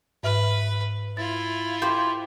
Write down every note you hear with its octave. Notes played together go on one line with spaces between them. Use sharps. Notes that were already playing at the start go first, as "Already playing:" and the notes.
G#2 B4 E5 F6
E4 F4 A6
G4 C5 F5